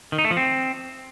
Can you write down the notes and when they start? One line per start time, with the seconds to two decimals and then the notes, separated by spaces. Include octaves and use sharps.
0.12 D#3
0.18 D#4
0.25 A3
0.31 F3
0.37 C4